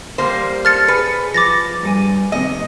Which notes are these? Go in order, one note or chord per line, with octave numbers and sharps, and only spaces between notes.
G3 A#3 C5
A4 F6 A6 C#7
G#4 B4 C#7
F3 D6 A6 A#6
G2 A4 G#5
D#2 C3 D#5